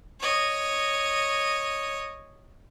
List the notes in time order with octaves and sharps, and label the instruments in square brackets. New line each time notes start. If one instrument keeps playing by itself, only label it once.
[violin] C#5 D#5